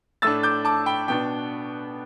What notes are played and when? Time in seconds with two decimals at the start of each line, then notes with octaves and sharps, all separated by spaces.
0.22 A2 A3 D4 E6 A6
0.43 D6 G6
0.65 A5 D6
0.86 G5 B5
1.08 B2 B3 D4 G5